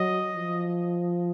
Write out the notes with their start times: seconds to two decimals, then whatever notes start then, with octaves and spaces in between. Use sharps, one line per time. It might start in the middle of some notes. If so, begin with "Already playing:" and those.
Already playing: F#3 D#5
0.35 F3